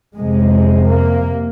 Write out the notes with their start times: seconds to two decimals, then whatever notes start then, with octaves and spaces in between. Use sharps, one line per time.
0.16 F2 C3 G#3
0.90 A#3